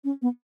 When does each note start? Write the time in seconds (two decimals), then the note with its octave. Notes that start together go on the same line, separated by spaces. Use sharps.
0.04 C#4
0.22 B3